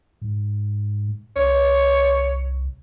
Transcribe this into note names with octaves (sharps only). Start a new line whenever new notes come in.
G#2
C2 C#5